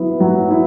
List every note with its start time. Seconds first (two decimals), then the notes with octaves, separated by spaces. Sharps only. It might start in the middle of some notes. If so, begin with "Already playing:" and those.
Already playing: F#3 B3 E4
0.20 F#3
0.49 B3 E4